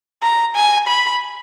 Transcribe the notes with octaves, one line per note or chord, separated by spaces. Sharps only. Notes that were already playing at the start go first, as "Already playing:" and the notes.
A#5
G#5
B5